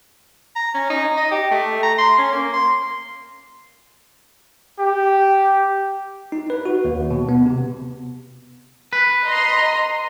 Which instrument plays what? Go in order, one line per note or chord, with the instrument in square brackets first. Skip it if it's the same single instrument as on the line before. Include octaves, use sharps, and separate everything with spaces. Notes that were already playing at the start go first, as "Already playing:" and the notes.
[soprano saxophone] A#5
C#4
D#4
D#5
G4
A3
A#5
C6
C#4
A#3
C6
[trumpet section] G4
[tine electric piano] D#4
B4
F#4
D#2
B2
B3
C3
[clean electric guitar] B4
[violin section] D#5 A#5 C6